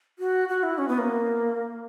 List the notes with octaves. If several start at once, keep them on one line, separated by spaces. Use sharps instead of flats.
F#4
F#4
E4
C#4
B3
A#3